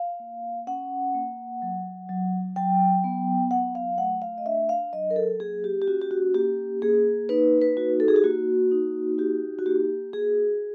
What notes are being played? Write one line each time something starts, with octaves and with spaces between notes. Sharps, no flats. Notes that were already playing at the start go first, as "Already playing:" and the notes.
Already playing: F5
A#3
C#4 F#5
A#3
F#3
F#3
F#3 G5
B3
F#3 F#5
F5
A3 F#5
F5
D#5
D4 E5
F5
F#3 D#5
A#4
A4
A#3 G#4
G4
G4
C#4 F#4
G4
F#4
A#3 G4
A#3 G#4
D#4 B4
B4
F#4
A4
G#4
G4
A#3 F#4
D#4
F#4 G4
F#4
A#3 G4
F#4 G#4